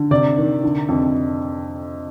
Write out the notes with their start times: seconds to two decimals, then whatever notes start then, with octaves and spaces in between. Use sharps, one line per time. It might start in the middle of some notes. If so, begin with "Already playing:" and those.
Already playing: D3
0.11 C3 D5
0.37 D#3
0.64 D3
0.89 F2